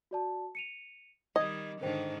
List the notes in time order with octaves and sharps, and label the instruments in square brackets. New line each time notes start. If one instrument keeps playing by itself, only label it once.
[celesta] F#4 D5 A5
C#7 D#7 F7
[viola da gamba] D#3 G3 [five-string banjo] D#5 [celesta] G#6
[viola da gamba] G#2 D3 D#3 [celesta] A#4 C5 G5